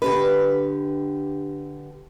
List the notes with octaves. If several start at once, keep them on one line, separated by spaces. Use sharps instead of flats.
D3 G4 B4